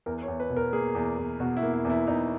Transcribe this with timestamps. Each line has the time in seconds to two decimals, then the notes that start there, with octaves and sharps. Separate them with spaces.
0.06 E2 A#4
0.23 C#5
0.28 E2
0.40 B4
0.50 B2
0.56 A#4
0.73 A#3 G#4
0.95 E2
1.18 E2
1.40 B2 F#4
1.57 E4
1.62 A#3
1.73 E4
1.85 E2
1.90 E4
2.07 E2 D#4